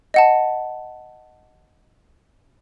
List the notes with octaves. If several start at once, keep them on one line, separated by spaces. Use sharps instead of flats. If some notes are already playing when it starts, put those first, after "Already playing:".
D#5 F#5 A5